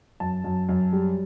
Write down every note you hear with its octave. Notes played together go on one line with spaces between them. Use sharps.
F#2 A5
F#2
F#2
G3